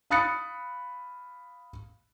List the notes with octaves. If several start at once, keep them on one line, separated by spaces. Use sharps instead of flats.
F5 B5 D#6 F#6 A6 C#7